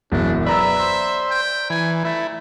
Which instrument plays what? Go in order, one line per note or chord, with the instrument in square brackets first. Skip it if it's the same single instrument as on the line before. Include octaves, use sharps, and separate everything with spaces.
[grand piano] E1 F#2 [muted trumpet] D4
[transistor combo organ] B4 [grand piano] D5 A#5 E6 [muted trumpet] E5
[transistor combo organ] C5
[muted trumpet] G5
[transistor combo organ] E3 [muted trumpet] G#5
[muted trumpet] A3 [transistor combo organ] E4